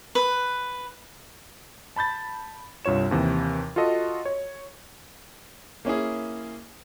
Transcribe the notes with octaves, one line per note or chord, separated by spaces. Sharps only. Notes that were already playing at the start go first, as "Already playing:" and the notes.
B4
A5 B5 G6 A6
C2 G2 F4 C#5 E7
D#2 C3 E3
F4 F#4 A4 D#5
C#5
A#3 C#4 E4 G#4